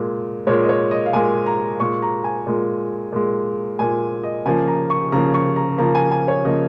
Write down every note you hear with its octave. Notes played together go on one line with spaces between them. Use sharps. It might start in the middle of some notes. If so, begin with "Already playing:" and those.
Already playing: A#2 G#3
A#2 G#3 C#5
D#5
C#5
D#5
F5
A#2 G#3 G#5
A#5
A#2 G#3 C#6
A#5
G#5
A#2 G#3
A#2 G#3
A#2 G#3 G#5
D#5
C#3 F3 A#3 G#5
A#5
C#6
C#3 F3 A#3 A#5
C#6
A#5
C#3 F3 A#3 A#5
G#5
G#5
C#5
C#3 F3 A#3 D#5